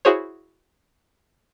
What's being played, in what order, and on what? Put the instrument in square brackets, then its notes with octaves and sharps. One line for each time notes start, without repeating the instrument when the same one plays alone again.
[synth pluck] E4 F#4 G#4 C5 C#5